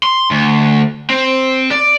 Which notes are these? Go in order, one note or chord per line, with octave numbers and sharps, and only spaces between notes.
C6
D2
C4
D5